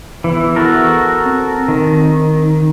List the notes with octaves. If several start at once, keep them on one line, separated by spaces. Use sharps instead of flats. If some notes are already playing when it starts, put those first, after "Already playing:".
E2 E3
F#4 A4 A#4
C4
D#3